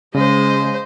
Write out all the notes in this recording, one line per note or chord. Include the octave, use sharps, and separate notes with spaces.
C#3 G#3 C5 D#5